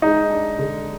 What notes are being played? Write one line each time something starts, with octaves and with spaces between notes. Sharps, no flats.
G#3 D#4
D4
D3